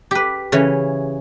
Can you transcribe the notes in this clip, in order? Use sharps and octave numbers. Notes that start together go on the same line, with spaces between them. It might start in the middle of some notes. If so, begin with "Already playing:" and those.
G4 B4
C#3 E3 C#5